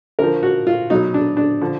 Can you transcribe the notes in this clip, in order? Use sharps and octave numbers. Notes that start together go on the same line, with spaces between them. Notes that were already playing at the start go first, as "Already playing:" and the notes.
D3 F3 A#4
F#4
F4
B2 F#3 D#4
D4
D4
D3 F3